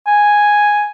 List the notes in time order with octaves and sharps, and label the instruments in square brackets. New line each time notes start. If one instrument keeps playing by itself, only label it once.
[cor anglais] G#5